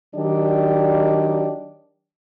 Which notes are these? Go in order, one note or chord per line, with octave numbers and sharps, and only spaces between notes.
D#3 F#3 D4 G4 D5 D#5